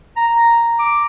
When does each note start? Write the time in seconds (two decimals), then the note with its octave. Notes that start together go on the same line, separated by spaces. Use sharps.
0.16 A#5
0.79 D6